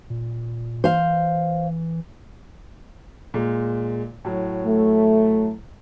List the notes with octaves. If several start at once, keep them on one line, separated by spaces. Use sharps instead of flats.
A#2
E3 C5 F5
A#2 G#3
A2 F#3
A3